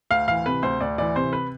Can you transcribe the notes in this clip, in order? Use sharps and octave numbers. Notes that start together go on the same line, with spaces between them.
D2 F5
E3 F5
C3 B4
D2 C5
D2 D5
E3 D5
C3 C5
B4